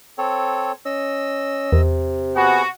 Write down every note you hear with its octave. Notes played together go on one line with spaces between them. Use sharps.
C4 A4 C#5
C#4 D#5 E6
E2 C3
B3 F#4 G#4 F#5